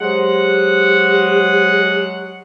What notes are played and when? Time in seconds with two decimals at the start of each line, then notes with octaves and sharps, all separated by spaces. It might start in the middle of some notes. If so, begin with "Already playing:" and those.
0.01 F#3 G#3 G4 G#4 C5 F#5